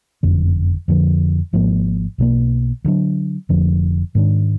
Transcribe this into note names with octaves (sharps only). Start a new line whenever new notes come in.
F#1 F2 D3
F2 D3 F3
G#1 G#2 F3 A#3
B1 B2 F#3 A#3
D2 D3 F#3 D4
F1 F2 D3 F3
G#2 D#3 A#3 D4